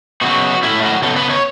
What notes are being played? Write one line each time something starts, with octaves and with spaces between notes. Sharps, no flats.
C#3 F#3 B3 F#4
A2 A3 C#4 E4
F#4
C#3 F#3 B3 A4
B4
C#5